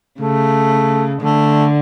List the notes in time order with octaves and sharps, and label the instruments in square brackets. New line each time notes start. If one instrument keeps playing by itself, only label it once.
[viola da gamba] C#3 [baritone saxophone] A3
[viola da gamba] D3 [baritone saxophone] A3